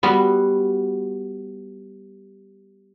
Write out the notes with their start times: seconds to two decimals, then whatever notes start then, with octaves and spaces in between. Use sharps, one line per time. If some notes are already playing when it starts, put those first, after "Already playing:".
0.03 G3 B3 F#4